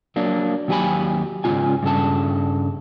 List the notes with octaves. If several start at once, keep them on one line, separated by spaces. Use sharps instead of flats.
F#3 A#3 D4
D#2 F#3 G4 A#4 G#5 B5
G#2 C#3 A#3 C#4 F4 G#5
G2 C#3 A4 A5